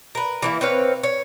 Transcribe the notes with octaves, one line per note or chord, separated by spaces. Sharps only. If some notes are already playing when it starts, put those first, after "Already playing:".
A#4 B4
E3 A#3 E4
C4 B4 C#5 F5
C#5